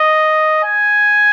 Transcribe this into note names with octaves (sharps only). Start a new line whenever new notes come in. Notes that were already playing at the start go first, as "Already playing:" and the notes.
Already playing: D#5
G#5